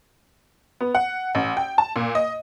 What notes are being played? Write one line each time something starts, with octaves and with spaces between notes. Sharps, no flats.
B3
F#5
A1
G5
A5
A#2
D#5